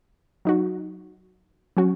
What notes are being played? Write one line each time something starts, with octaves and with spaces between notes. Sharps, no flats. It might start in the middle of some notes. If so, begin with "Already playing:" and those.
F#3 D#4 F#4
F#3 C#4 F#4